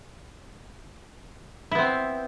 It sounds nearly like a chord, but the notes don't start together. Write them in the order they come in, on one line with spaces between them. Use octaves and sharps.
E4 B3 C4